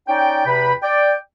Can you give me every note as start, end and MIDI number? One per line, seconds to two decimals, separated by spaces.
0.08 0.44 61
0.08 0.44 63
0.08 0.44 74
0.08 0.44 79
0.46 0.72 40
0.46 0.72 48
0.46 0.72 71
0.46 0.72 79
0.46 0.72 83
0.83 1.13 74
0.83 1.13 79